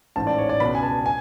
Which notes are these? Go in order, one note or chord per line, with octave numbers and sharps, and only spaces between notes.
A1 G#2 A5
D5
C#5
D5
C#2 B2 B5
G#5
A5
G#5